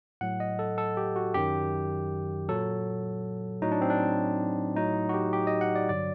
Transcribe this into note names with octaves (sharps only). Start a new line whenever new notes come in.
A2 F#3 F#5
D#5
A4
A4
G4
F#4
F#2 D#3 F#3 G4
A#2 F#3 A4
A2 F#3 D#4
D4
C4
D4
A2 F#3 D#4
F#4
G4
G4
D#5
F#5
D5
G2 D3 F#3 D5